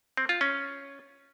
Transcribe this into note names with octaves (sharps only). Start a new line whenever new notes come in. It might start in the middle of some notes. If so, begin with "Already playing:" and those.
C4
F4
C#4